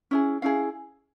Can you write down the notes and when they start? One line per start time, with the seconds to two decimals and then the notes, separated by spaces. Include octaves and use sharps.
0.11 C#4 E4 G#4
0.42 C#4 E4 G#4 F5